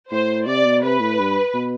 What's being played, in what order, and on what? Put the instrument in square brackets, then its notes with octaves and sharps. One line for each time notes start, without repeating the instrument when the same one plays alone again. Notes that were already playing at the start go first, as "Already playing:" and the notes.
[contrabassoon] A2 [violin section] C5
[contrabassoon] C3 [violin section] D5
[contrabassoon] B2
[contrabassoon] C3 [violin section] B4
[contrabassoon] A2
G2
B2